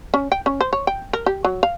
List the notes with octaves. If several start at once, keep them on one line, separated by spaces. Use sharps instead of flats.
C#4
G5
C#4
C5
C#5
G5
A#4
G4
F#3
F5